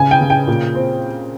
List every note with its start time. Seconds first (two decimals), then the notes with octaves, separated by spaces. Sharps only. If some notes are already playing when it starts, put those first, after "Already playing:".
Already playing: C#3 G#5
0.11 G5
0.21 C#3
0.30 G5
0.48 A#2
0.75 C4